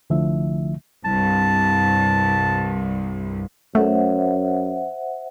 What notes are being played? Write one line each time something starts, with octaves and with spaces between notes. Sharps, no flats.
C2 D3 F3 A3 E4 E5
C2 G2 A5
F#2 A3 C5 E5 F#5